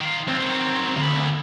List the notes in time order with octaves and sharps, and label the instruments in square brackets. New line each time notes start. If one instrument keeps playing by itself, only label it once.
[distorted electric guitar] D#3 F4
[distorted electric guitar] B1 [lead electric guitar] C4
[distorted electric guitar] D#3 F#3
[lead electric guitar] D2 [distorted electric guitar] A#3 B5